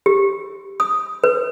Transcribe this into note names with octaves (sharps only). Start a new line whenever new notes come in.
G4
D#6
B4